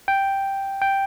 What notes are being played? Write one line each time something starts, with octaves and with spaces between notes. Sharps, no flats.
G5
G5